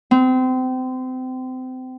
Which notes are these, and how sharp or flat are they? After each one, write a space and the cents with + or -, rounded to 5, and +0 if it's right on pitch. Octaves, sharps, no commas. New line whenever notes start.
C4 -30